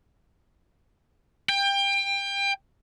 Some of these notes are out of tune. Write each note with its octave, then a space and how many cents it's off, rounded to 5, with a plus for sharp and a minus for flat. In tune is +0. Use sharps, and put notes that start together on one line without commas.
G5 +25